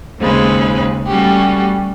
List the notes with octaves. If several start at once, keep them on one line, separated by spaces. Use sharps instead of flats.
D#2 C#3 G#3 C4 B4
G3 A3 C#4 F#4 G4